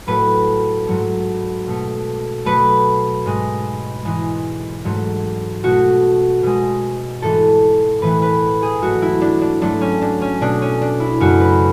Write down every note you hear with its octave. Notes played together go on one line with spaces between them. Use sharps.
A2 F#3 A3 B4
G#2 F#3 A3
B2 A3
B2 F#3 A3 B4
G#2 G#3
G#2 E3 G#3
G#2 F#3 A3
B2 A3 F#4
B2 G#3
G#2 E3 A3 A4
A2 E3 A3 B4
B4
G#4
G#2 F#3 A3 F#4
E4
D4
D4
G#2 F#3 A3 D4
C#4
D4
C#4
B2 A3 D4
C#4
D4
E4
F#2 C#3 F#3 A3 F#4
B4